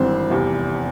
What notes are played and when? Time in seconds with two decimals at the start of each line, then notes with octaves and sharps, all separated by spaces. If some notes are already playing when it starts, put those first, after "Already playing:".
Already playing: G#1 G2 E3 C4
0.30 F1 E2 C3 G3